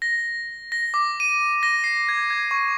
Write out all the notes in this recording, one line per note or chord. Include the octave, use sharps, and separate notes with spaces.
A#6
A#6
D6
D#7
A#6
C7
G#6
G#6
C#6